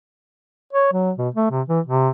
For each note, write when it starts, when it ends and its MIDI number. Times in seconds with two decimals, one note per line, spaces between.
0.73 0.88 73
0.92 1.11 54
1.18 1.28 47
1.34 1.49 57
1.51 1.62 48
1.68 1.80 52
1.86 2.09 48